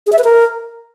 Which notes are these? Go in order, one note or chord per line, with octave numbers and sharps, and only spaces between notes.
G#4
E5
B4
A#4